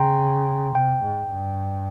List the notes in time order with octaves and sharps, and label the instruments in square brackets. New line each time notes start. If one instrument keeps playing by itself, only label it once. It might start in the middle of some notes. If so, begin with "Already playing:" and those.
Already playing: [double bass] C#3 [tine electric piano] G5 A#5 C6
[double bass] C3 [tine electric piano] G5
[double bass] G#2
G2